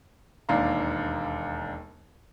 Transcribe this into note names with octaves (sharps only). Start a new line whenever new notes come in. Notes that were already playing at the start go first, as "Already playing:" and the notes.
E1 D#2 D4 F5 A#5